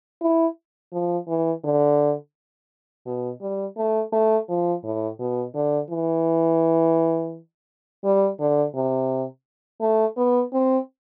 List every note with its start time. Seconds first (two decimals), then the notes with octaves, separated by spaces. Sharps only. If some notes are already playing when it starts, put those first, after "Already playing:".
0.21 E4
0.93 F3
1.27 E3
1.64 D3
3.06 B2
3.41 G3
3.77 A3
4.13 A3
4.49 F3
4.84 A2
5.19 B2
5.55 D3
5.90 E3
8.04 G3
8.40 D3
8.75 C3
9.81 A3
10.17 B3
10.53 C4